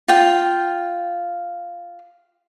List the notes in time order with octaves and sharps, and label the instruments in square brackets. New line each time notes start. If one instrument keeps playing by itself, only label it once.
[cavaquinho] F4 G5